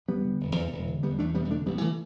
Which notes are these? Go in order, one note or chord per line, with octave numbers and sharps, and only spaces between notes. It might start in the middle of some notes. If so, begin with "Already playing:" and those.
E1 G3 B3
D3
E1
E2
E1
D3
E1 G3 B3
E2 A3 D4
E1 G3 B3
D3 A3 D4
A1 G3 B3
E3 A3